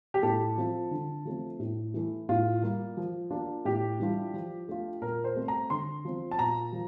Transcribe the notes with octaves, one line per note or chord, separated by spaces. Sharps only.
G4
A2 A4
F3 C4 F4
D3
F3 A3 C4
A2
E3 A3 E4
A2 F4
G3 A#3 F4
F3
A#3 D4 F4
A2 G4
E3 G3 D4 F4
F3
A3 D4 F4
A#2 A#4
C5
A3 C4
A#5
D3 C6
F3 C4
A5
A#2 A#5
F3